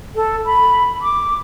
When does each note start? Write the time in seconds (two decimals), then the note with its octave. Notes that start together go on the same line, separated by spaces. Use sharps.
0.15 A4
0.46 B5
1.02 D6